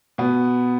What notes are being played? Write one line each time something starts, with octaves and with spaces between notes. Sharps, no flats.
B2 B3